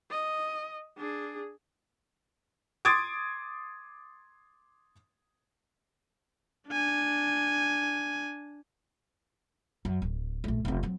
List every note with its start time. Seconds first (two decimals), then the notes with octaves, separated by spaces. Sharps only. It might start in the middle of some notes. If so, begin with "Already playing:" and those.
0.10 D#5
0.98 D4 G#4
2.85 C6 D6 D#6 G#6 A6 D7
6.68 D4 G#5
9.85 F#2
10.02 D1
10.44 A#1 A3
10.65 F1 C4
10.83 F#3 C4